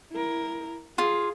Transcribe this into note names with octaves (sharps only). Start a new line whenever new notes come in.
E4 A#4
F4 G#4